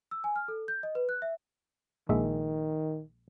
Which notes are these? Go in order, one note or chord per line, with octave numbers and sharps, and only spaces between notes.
E6
G#5
F6
A4
G6
D#5
B4
F#6
E5
A#1 D#3 G#3 E5